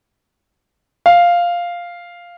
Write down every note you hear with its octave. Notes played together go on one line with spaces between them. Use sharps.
F5